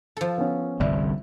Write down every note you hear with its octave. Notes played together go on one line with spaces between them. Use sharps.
F3 A4
B3 C#4
G1 C2 G2 D5 E5